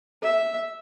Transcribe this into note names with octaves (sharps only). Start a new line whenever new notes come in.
E5